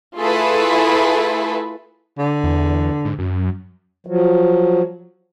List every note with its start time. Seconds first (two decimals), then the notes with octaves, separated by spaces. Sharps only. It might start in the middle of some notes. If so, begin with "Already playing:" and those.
0.16 A3 E4 F4 G#4 A4 B4
2.18 D3
2.43 E2
3.05 G#2
3.18 F#2
4.07 F3 F#3